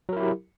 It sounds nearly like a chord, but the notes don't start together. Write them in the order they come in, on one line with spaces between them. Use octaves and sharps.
F#3 A#4 E4 G4